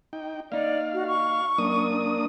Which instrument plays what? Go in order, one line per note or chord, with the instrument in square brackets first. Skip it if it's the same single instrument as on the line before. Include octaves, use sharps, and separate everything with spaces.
[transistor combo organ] D#4 G5
[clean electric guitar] A#3 D#4 [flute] D5 [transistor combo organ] F5
[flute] F#4
C#6
[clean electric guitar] F#2 [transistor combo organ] A#3 D4 D#6